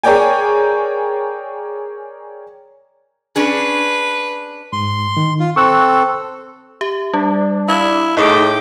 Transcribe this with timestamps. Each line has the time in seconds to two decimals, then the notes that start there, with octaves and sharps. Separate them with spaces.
0.03 G#4 A#4 C#5 D5 G5 G#5
3.36 C#4 D4 G#4 B4
4.73 G#2 C6
5.17 D#3
5.39 F4
5.56 C4 A4 C#6 E6 F#6
6.81 G4 E5
7.13 G3 D4
7.68 E4 F5 G#6
8.17 A2 D#4 E4 G#4 G5 D6